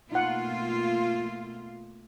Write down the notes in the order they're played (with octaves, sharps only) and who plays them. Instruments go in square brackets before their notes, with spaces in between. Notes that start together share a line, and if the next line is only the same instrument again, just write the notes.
[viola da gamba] B2 A3 A#3 [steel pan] D#4 F#5 [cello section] F4